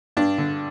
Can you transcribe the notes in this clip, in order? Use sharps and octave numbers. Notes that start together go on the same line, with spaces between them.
G2 D4
D3